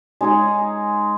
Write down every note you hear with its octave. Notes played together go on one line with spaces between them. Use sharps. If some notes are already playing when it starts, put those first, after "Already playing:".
G#3 D#4 G#4